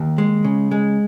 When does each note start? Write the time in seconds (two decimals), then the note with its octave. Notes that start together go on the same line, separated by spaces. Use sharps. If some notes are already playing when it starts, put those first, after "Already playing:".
Already playing: D#2
0.18 G#3
0.44 C#3
0.71 G#3